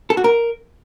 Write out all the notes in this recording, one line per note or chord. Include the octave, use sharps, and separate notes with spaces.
A4
F#4
A#4